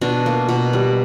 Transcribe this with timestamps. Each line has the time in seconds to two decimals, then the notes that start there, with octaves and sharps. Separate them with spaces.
0.01 B2 D4
0.26 A#3
0.49 B2
0.73 G3